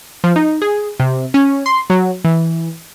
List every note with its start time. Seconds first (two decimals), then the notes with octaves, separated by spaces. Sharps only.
0.24 F3
0.36 D#4
0.62 G#4
1.00 C3
1.34 C#4
1.66 C6
1.90 F#3
2.24 E3